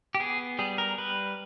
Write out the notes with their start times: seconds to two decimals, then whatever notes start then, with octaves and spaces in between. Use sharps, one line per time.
0.15 G4
0.20 B3 G#4
0.59 G3 G#4
0.78 A#4
0.98 G3 B4